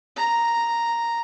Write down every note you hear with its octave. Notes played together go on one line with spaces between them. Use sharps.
A#5